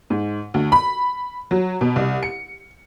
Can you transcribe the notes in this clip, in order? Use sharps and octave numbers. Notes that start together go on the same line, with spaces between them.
G#2
D2
B5
F#3
B2
C2
C#7